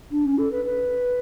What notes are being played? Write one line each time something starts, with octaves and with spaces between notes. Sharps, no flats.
D4
C#4
A4
B4
B4